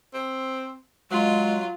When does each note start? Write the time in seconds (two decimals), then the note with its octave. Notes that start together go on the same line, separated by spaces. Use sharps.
0.14 C4
1.11 F#3 G#3 F4